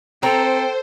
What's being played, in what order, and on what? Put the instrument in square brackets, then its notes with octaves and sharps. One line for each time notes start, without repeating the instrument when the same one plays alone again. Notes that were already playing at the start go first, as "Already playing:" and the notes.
[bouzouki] C4 A#5 [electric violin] A4 [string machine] C5 [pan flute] G5